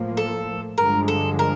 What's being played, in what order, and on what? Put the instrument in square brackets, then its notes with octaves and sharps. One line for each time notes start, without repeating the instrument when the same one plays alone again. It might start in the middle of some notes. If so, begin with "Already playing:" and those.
Already playing: [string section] A2 F3 A#3
[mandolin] A4
[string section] G2 D3 F3 G#3 [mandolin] A#4
[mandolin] A4
A#4